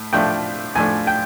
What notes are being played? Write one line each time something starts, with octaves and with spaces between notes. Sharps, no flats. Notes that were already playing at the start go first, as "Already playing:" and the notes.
Already playing: A2
A2 F3 A3 D4 G5
A2 F3 A3 D4 G#5
G5